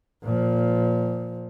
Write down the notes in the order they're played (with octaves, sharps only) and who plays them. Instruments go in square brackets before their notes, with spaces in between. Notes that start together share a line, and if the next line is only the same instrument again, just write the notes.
[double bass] A#2 F3